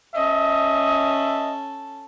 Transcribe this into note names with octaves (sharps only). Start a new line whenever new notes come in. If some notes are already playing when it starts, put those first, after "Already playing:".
C#4 A4 D#5 E5